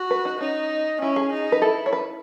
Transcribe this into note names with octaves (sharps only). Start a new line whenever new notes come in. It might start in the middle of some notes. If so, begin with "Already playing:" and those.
Already playing: F#4
B4
D#4
C#4 D#4
C#4 E4
G#4
D#4
B4
E4 A4
C#5
B4